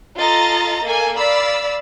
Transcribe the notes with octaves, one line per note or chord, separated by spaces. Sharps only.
F4 A4 D#5 A#5 A6
A#3 A4 G#5
D5 F5 B5 E6